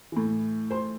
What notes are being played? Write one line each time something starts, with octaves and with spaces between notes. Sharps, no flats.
A2 E3
C5 C6